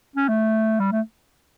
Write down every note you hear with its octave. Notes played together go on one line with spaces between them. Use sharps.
C#4
A3
G3
A3